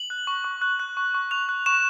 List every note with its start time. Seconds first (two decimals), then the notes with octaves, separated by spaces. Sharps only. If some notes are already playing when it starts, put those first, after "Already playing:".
Already playing: F#7
0.10 F#6
0.27 C#6
0.45 C#6
0.61 F#6
0.80 F#6
0.97 C#6
1.14 C#6
1.31 F#6 F7
1.49 F#6
1.66 C#6 E7